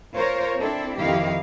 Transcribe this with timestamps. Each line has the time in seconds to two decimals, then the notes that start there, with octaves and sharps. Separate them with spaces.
0.13 F4 A#4 C5 C#5
0.57 C4 D4 E4 A4
0.97 F2 D#3 D#4 E4 G4 F5